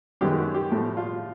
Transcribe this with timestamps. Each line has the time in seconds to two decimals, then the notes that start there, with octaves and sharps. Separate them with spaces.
0.21 F#2 D#3 G#3 B3 G4
0.39 F#4
0.54 G4
0.71 A2 F3 A3
0.97 F4